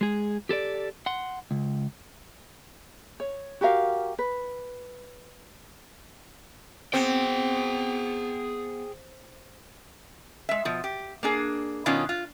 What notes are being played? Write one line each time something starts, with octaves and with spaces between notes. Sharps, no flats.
G#3 G#4
G4 A4 B4 D5
F#5 C6
C#2
C#5
F#4 G4 A#4 F5
B4
B3 C4 G#4 G5
G#3 E5
B2 F3
G4
A#3 D4 G#4
B2 D#3 C#4 D4 F4
F4